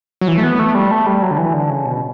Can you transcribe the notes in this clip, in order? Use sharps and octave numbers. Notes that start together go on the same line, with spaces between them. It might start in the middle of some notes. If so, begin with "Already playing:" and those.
F#3
E3
A3
B3
A3
G3
A3
G3
F#3
D3
E3
D3
C#3
B2